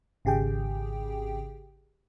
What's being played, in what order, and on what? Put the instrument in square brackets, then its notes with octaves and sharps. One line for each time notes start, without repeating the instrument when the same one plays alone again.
[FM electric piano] G#1 C#3 G4 G#4 G5